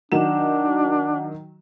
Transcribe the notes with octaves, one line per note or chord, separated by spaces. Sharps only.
D#3 F#3 D4 F#5 E7